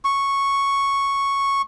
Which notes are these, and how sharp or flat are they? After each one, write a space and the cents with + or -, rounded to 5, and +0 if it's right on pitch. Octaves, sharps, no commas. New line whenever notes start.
C#6 -5